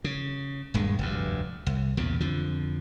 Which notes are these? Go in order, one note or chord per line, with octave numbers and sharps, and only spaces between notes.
C#3
D#1 G2 G#3
F1 D2 G2
C2
B1 E2 A#2 C#3
F2 D3 F3